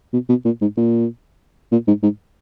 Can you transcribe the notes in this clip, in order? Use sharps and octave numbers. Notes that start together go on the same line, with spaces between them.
B2
B2
A#2
G#2
A#2
A#2
G#2
G#2